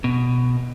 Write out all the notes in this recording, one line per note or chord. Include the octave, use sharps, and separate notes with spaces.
B2